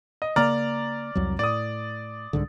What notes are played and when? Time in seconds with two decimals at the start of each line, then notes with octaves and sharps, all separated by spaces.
0.22 D#5
0.36 C#3 A#3 D5 A#5 F6
1.15 C2 F2 F#3
1.39 A2 D5 D#6
2.33 C2 G#2 D3